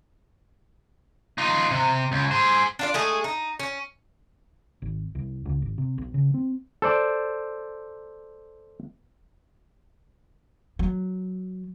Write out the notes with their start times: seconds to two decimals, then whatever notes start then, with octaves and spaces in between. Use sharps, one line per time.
1.38 D#4 F4
1.71 C3
2.12 C#2
2.31 G#4 C5
2.79 D4 F4 D5
2.94 G#3 A3 G#4
3.24 D#4
3.59 C#4
4.82 G#1
5.15 C2
5.46 C#2
5.62 G#1
5.78 C3
5.98 B1
6.14 C#3
6.34 C4
6.82 A4 C5 D5
10.79 F#3